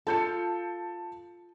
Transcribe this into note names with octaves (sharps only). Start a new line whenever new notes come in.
F4 A4 A5 G6 C#7